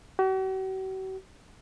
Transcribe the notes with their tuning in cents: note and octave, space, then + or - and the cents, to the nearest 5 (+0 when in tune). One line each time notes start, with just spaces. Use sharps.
F#4 +45